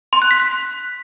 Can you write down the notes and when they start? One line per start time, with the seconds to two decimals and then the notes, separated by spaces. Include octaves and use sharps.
0.13 C6
0.22 F#6
0.31 B6
0.40 F#6